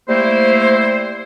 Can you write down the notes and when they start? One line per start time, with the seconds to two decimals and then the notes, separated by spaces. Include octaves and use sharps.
0.08 G3 A3 A#3 E4 C5